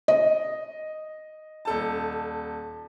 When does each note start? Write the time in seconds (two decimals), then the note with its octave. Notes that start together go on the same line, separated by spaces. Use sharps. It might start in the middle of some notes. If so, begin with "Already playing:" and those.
0.08 D#5
1.65 D#1 A4 A5